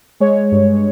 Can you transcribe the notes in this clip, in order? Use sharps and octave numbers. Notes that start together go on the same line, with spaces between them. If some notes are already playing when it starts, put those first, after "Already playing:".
G#3 C#5
G2